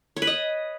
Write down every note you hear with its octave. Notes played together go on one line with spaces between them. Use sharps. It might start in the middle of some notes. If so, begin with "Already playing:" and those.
C#5
B4
D#5